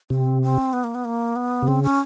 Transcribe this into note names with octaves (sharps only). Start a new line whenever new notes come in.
C3 C4
C4
B3
A#3
B3
A#3
B3
C3
C#3 C4
C#4